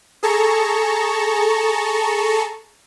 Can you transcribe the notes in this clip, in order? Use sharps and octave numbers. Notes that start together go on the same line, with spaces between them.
G#4 A4 A5 A#5 C#6